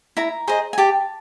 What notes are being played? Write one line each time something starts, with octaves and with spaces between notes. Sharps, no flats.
E4 A#5
G#4 C5 D#5
G#5
G4 A5